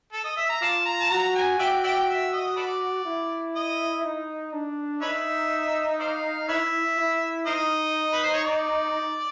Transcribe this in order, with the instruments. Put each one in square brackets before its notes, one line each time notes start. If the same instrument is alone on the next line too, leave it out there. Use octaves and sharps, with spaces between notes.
[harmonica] A4
D#5
E5
A#5
[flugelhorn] F4 [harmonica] D5 F5 A5
[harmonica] A#5
A5
[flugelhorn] F#4 [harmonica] A#5
[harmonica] G#5
[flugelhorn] F#4 [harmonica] D5 E5 G5
[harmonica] D5 E5 G5
E5
D#5
A4 B4 D5
[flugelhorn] E4
[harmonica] D#5
[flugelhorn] D#4
D4
[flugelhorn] D#4 [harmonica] B4 C#5 E5
[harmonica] C5 D5 F5
[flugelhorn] E4 [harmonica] B4 C#5 E5
[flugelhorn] E4
[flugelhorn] D#4 [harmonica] A#4 C5 D#5
[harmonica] B4
C5
C#5
D5